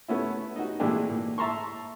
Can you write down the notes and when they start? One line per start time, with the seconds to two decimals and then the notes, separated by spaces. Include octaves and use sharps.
0.08 A3 B3 C#4 E4
0.56 D#4 F#4
0.80 A#2 E3 G#3 A3 D4 G4
1.09 A#2
1.38 E5 A5 A#5 C6 C#6